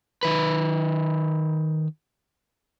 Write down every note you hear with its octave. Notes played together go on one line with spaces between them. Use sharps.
D#3 B4